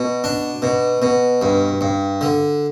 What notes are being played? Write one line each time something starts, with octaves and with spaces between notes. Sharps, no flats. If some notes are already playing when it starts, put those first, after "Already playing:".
Already playing: B2
D4
B2
B2
G2
G2
D3